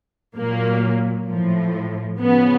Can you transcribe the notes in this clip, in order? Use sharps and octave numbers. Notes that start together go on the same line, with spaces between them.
A#2 F#3 A#3
A2 F3
C#3 F3 B3